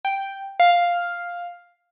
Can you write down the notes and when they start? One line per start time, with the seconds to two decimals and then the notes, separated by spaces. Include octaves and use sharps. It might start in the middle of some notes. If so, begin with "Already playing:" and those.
0.05 G5
0.60 F5